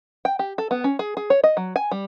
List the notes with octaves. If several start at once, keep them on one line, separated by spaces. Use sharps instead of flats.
G5
G4
A4
B3
C#4
G#4
G#4
C#5
D#5
F#3
G#5
G3